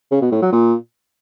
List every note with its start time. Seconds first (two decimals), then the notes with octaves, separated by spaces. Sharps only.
0.11 C#3
0.21 B2
0.32 A2
0.42 F#3
0.52 A#2